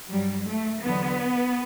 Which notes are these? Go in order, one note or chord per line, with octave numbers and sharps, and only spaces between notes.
G2 F#3 G3
A3
E2 D3 F#3 B3